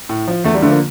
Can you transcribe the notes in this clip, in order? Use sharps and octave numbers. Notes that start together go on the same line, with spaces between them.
A2
F3
E2 A3
G3
D3 F3 A3 A#3